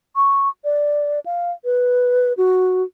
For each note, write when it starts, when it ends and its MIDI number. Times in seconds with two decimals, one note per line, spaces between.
0.16 0.49 85
0.64 1.19 74
1.26 1.51 77
1.65 2.33 71
2.37 2.83 66